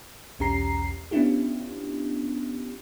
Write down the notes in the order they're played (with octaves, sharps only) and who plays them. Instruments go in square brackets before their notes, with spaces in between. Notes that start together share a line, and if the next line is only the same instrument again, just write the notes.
[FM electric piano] B1 E2 C#4 G4 A#5 C7
B3 C#4 D4 E4 F4 G4